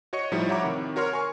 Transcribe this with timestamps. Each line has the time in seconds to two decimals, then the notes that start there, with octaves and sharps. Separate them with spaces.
0.13 F#4 C#5 D#5 C#6 C#7
0.32 A2 F3 G3 D#4 E4
0.49 C#5 E5 F#5 A#5 B5 D6
0.63 C3 D#3
0.96 F#4 A#4 C#5 C6 F6
1.13 G#5 C#6